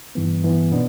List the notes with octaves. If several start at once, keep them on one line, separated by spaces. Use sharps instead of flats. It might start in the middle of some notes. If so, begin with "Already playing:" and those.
G2 E3 B3
G2 E3 B3
B2 B3 D4